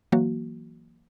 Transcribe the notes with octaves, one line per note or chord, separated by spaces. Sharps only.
E3 F#3 A#3 F#4